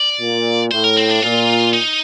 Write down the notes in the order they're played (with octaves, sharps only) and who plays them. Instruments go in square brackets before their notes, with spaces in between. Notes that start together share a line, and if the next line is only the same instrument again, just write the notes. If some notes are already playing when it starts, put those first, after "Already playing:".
Already playing: [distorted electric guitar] D5
[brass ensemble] A#2
[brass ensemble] A2 [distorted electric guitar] C5
[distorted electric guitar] A#4
C4
D4
[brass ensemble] A#2 [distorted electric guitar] F4
[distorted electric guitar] D#4